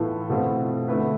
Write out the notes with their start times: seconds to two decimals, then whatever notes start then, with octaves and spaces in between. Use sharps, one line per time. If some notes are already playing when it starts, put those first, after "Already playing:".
Already playing: A2 E3 B3 F4 A4
0.30 B2 A3 C4 F4
0.88 D3 A3 E4 B4